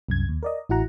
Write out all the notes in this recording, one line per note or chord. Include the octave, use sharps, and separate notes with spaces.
C2 F#2 G#6
D#2
A#4 D5 D#5
A1 E4 F#4 F#5 A#5